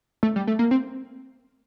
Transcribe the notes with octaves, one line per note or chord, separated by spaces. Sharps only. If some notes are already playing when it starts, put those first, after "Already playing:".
A3
G3
A3
A#3
C4